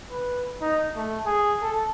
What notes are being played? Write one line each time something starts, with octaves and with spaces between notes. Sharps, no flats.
B4
D#4
A3
G#4
A4